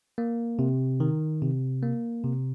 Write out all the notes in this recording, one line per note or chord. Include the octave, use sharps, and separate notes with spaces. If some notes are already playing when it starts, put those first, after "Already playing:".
A#3
C3
D#3
C3
A#3
C3